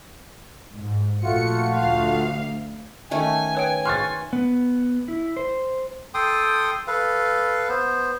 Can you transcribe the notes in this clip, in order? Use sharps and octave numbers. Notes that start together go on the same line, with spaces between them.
G#2
A#1 A3 F4 F#4 C#7
D2 F5
D#3 A3 C#4 G#5
B4 C#5 G5
C6 C#6 F6 F#6 A6
B3
E4
C5
A4 G5 C6 D#6
A4 B4 F5
B3 C5